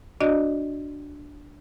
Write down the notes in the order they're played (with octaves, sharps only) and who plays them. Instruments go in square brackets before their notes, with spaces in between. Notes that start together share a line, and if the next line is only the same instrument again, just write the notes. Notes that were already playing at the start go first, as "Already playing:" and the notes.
[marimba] D4 F#4 D5 D#5